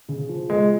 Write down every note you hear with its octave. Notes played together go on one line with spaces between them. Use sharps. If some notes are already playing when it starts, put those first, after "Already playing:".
C#3
F3
G#3